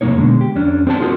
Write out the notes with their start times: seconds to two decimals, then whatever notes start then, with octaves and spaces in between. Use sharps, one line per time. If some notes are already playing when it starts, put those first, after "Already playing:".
0.01 F2 C3 E3 A#3 D#4 C#5
0.18 B2 D3 G#3
0.41 G4
0.55 F2 C#4 D4
0.87 C4 G#4 C5 D5 F5 A5
1.00 D#4 F4 F#4 G#4 A#4